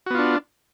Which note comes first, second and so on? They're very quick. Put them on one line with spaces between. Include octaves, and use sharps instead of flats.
F#4 B3 F4 D4